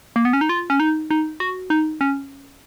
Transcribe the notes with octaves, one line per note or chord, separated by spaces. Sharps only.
A#3
B3
C#4
D#4
F4
C#4
D#4
D#4
F#4
D#4
C#4